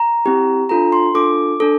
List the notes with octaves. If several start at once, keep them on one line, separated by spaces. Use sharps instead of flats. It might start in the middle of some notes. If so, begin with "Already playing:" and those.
Already playing: A#5
C4 E4 G4
D4 F4 A4 A#5
C6
D4 F4 A4 D6
D4 A4